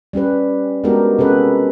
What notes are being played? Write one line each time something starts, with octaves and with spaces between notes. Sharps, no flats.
G3 C#4 G4 B4
G#3 B3 D4 F#4 G4 A#4
C3 C#4 G#4 A4 B4